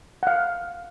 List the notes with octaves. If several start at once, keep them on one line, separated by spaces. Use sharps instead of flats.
F#5
F5